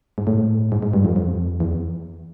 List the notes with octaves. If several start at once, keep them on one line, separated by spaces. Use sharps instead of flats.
G#2
A2
G#2
G#2
G2
F2
F2
E2